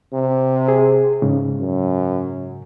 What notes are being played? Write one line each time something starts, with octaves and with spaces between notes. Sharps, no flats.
C3
G#4
G#2 C#3
F#2